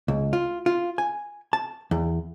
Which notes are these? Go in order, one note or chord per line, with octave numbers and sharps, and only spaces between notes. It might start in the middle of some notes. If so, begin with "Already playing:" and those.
C#2
F4
F4
G#5
A5
E2